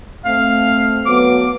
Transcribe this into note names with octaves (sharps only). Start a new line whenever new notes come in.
A3 C4 F5
F#3 A3 B3 F#4 D6